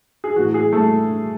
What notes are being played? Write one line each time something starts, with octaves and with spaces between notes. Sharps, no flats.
G#4
A2 E3 F#4
G#4
A3 A4